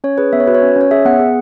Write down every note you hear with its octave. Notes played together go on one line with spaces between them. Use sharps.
C#4 C#5
G#4 B4
B3 E5
C#5
F#4 B4
C#5
C#4
C#4 C#5
G#4 E5
B3 F#5
G#4